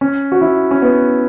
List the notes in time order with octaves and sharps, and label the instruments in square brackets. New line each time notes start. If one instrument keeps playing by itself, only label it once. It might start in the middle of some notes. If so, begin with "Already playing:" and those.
[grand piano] C#4
F#4
E4
C#4
B3